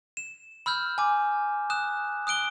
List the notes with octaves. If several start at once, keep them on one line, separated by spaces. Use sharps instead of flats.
E7
B5 E6 F6 G6
G#5 D6
D#6 F#6 E7
D#6 F#6 D7 G7